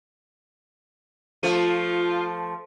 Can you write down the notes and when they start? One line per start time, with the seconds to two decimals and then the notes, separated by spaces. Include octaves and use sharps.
1.43 F3 A3 F4